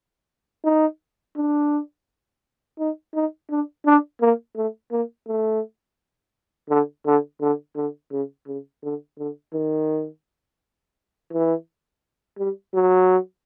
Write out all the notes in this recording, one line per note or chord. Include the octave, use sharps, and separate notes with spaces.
D#4
D4
D#4
D#4
D4
D4
A#3
A3
A#3
A3
D3
D3
D3
D3
C#3
C#3
D3
D3
D#3
E3
G3
F#3